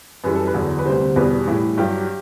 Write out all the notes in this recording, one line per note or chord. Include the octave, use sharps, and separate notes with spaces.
F#2 E3 G3 B4
A4
B4
E2 D3 F#3
B4
D2 C3 G3 C5
E2 B2 G3 B4
A2 E3 G3
G2 F#3 G4